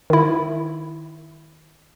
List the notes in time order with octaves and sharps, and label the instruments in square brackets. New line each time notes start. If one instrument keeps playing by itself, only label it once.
[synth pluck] D#3 E4